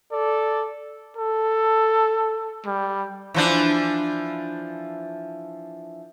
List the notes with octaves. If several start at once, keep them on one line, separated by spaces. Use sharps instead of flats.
A4 D5
A4
G3
E3 F3 D4